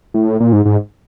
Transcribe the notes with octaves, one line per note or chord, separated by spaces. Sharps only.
A2
A#2
G#2
G#2